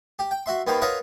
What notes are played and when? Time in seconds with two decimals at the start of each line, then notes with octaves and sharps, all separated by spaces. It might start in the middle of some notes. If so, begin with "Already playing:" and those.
0.19 G4
0.31 G5
0.46 F#4 E5 C6
0.67 D#2 D#3 B3 A#4 C5
0.82 F4 A#4 B4 C#5 D#5 F#5